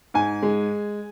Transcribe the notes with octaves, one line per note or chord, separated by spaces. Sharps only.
G#2 G#5
G#3